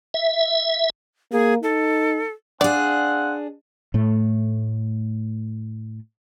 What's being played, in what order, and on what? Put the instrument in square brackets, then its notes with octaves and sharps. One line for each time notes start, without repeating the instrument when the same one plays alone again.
[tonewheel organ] E5
[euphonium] A#3 [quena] G#4
[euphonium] D#4 [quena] A4
[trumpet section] C4 F5 F#5 [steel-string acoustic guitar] D4 G#4 [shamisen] D5
[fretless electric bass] A2 A3